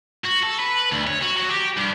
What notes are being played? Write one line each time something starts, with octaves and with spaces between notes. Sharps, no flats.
F#4
A4
B4
D2
C#5
F#4
F#3
G4
G2